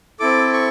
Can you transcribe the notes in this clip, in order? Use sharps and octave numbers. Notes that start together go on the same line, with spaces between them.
C4 E4 A4 D6
C#6